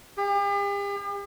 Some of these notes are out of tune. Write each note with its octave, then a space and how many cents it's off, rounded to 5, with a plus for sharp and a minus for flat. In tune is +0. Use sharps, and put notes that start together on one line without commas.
G4 +45